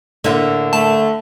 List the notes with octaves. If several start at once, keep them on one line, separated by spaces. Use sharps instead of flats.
A2 D3 A#3 E5
A3 A5